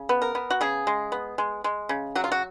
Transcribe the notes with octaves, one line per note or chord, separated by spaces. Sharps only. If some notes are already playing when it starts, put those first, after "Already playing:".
Already playing: C#3
B3
A#4
B3
F#4
C#3 G#4
G#3
B3
G#3
G#3
C#3
F#3 F#4
F4
F#4